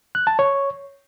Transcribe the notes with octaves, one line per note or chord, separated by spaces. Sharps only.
F#6
A5
C#5